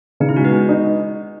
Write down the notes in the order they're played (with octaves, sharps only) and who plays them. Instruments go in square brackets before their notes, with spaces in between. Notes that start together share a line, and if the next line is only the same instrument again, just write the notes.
[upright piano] C#3 [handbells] D#4
[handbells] E4
[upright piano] G#3 [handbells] F#4
[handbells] B3 B4
[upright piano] G#3
D#4